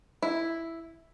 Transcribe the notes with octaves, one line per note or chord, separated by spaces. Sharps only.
E4